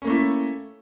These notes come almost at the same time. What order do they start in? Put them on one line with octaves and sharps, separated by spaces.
C#4 A#3 A3 E4